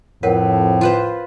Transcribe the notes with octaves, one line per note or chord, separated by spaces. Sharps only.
F2 A2 A#4 B4 C#5 F#5
F4 B4 C5